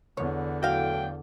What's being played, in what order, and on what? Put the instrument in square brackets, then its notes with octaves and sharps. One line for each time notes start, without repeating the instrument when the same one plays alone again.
[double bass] E2 D3 [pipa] C#5
[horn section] A2 F#3 G5 [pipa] F#4 F5